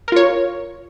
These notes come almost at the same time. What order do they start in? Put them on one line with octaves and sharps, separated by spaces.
A#4 F4 C#5